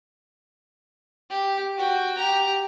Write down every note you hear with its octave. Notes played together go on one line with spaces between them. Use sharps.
G4
F#4 G5
G4 A#5